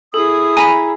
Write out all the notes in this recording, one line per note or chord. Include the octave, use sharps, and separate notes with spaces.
E4 G#4 A4 D#6
G#5 A#5 B5 D#7